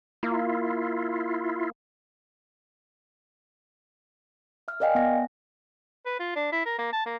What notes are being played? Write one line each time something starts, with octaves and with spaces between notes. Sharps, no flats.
A#3 E4 F4
E5 F6
A#4 D5 D#5 F5 G5 G#5
B3 F#5 A#6
B4
F4
D4
E4
A#4
A#3
A5
A#3